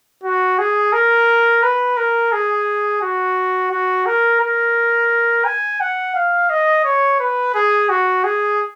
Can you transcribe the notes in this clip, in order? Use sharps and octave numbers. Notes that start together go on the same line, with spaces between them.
F#4
G#4
A#4
B4
A#4
G#4
F#4
F#4
A#4
A#4
G#5
F#5
F5
D#5
C#5
B4
G#4
F#4
G#4